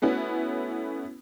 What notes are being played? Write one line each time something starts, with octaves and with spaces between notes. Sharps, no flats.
A3 B3 C#4 E4 F#4